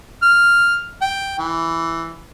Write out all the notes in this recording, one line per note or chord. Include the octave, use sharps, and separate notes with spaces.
F6
G5
E3